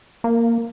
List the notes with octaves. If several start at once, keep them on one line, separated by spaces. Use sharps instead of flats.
A#3